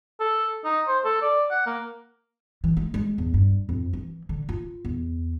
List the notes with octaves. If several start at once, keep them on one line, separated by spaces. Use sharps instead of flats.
A4
D#4
C5
A4
D5
F#5
A#3
E3
G#3
G#3
E2
G2
F2
E3
D3
F4
E2